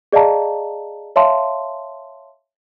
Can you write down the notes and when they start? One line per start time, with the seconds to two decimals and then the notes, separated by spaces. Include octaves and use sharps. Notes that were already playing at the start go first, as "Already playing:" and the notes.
0.13 G#4 D5 D#5 F5 A5 A#5
1.16 C#5 E5 F5 A5 C6